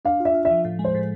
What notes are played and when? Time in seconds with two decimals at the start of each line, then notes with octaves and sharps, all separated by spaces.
0.05 D4 F5
0.20 F4
0.25 E5
0.34 F4
0.45 E5
0.50 F3
0.65 A2
0.79 G#3
0.84 C5
0.95 A2